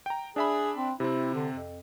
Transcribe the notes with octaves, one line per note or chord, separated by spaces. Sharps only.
G5 A#5
D4 G#4 E5 B5
C4
C3 C4 E4
D3
F2